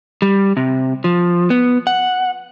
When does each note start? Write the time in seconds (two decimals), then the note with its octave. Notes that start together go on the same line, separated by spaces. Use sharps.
0.22 G3
0.57 C3
1.04 F3
1.50 B3
1.87 F#5